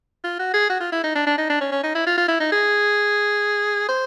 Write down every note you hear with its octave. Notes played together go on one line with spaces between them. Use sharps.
F4
F#4
G#4
F#4
F4
E4
D#4
D4
D4
D#4
D4
C#4
C#4
D#4
E4
F4
F4
E4
D#4
G#4
C5